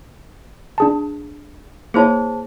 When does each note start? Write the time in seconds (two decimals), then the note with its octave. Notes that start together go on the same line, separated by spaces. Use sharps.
0.78 D4 G#4 A5
1.94 A#3 E4 G#4 C5 C#5 A5